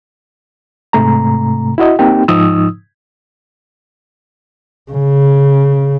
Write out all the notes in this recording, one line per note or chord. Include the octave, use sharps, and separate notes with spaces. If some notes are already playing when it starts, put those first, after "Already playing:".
G#2 C3 A3 A#5
E4 F#4 D#5
A#3 C4 D#4 G4 G5
G#2 F3 D#4 D#6 E6
C#3